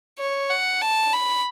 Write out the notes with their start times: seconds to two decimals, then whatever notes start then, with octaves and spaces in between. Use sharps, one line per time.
0.19 C#5
0.50 F#5
0.82 A5
1.13 B5